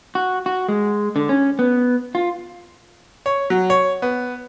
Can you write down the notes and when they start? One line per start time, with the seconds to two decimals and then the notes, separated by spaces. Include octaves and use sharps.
0.15 F#4
0.46 F#4
0.68 G#3
1.16 D3
1.29 C#4
1.59 B3
2.15 F4
3.26 C#5
3.50 F#3
3.70 C#5
4.02 B3